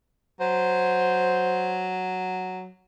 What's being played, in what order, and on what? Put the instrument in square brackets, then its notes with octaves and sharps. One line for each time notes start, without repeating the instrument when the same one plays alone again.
[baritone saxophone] F#3 [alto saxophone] C5